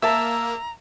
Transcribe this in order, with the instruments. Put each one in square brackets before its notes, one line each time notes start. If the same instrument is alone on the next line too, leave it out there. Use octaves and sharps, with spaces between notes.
[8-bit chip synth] A#3 [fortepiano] E5 A5 [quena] A#5 [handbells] E6